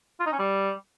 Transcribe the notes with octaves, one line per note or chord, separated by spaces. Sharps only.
F4
D#4
C#4
G3